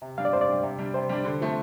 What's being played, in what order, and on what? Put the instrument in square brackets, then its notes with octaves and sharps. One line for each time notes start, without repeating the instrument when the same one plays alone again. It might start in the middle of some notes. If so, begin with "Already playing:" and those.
[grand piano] C3
[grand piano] G3 D4 [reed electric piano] F5
[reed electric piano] D5
[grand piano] C3 [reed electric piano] C5
[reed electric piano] D5
[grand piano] G3 D4
C3
G3 D4
[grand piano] C3 [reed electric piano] C5
[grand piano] G3 D4
D3
F3 A3 C4 A4